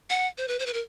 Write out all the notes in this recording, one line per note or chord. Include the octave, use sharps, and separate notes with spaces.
F#5
C5
B4
C5
B4
A#4